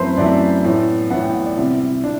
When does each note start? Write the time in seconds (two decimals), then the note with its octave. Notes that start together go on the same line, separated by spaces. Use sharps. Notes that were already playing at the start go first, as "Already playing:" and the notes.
Already playing: F#2 E3 A3 C4 B4 C5
0.17 F#2 E3 A3 C4 D5
0.64 A2 E3 B3
1.10 A2 E3 B3 F#5
1.22 G5
1.34 F#5
1.45 D5
1.57 C3 G3 C4 E4
1.80 E4
1.93 E4
2.04 C3 D4